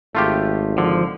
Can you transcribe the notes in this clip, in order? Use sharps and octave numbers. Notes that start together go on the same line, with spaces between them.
G#1 A3 F4 G4
D3 F3